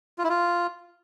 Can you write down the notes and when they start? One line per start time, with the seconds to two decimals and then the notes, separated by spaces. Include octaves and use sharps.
0.18 F4
0.24 E4
0.30 F4